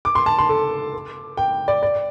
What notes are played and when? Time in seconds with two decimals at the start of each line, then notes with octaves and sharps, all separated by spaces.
0.05 D6
0.15 C6
0.26 A5
0.38 C6
0.49 A4
1.37 G5
1.68 D5
1.83 D5